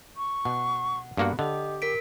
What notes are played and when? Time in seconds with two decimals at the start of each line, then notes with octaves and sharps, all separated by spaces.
0.17 C#6
0.45 B2 F#5
1.17 G2 A#3 B3 F#4
1.39 D3 G4 D#5
1.82 A#4 B6 D7